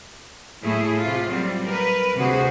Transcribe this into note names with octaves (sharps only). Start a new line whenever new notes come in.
A2 A3 E4 G#4
C3 F4
F#3 G3 C4
A#4 B4
D2 C3 F#4 G#4 C5